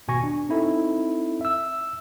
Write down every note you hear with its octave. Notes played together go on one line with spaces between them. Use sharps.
G#1 B2 G#5 C#6 A#6
D4
C4 D#4 E4 A4
E5 E6